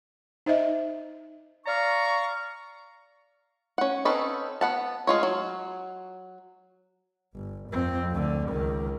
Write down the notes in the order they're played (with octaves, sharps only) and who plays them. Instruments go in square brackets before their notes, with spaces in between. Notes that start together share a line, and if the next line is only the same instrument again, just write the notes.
[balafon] D#4 C5 D#5 E5
[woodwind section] D5 F5 A#5 C#6
[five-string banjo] C#4 F#5
C4 C#4 D#4 A4 B4
B3 F#5 A5
G#3 F4 C#5
F#3
[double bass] G1
F2 C4
D2 D3
C#2 D#3